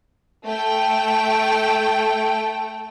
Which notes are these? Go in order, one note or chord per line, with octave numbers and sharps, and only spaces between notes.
A3 G5